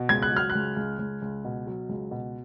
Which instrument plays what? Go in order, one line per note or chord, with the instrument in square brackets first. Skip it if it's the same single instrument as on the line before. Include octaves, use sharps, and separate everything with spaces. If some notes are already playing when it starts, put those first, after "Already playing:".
Already playing: [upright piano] B2
C#2 G#6
F#6
F#3 F6
F#6
C#2
C#2
C#2
C#2
B2
F#3
C#2
B2